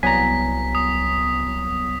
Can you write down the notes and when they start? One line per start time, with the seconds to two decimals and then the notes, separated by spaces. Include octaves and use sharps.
0.03 C2 F#3 B3 G#5 A#5 B6
0.75 D#6